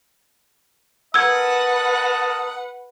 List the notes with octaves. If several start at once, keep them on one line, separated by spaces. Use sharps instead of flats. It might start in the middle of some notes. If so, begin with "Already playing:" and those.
A#4 B4 D#5 F#5 A5 E6 G#6